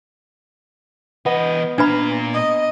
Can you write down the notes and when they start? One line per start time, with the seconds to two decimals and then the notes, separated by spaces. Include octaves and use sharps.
1.26 E3 B3 D#5
1.78 A#2 D4 B4 A#5 B5
2.34 D#5